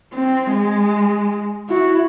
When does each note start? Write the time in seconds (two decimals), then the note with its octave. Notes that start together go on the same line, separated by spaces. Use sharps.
0.14 C4
0.52 G#3
1.69 E4 F#4